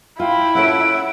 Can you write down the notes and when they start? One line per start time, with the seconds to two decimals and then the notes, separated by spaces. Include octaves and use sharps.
0.20 E4 F4 G5
0.55 C#4 A4 C#5 E5 F#5 D7